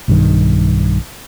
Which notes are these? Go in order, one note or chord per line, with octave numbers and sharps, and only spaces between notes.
B1 G2 D#3